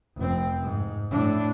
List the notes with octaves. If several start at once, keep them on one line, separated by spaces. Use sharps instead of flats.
F1 C4
G#2
A2 D4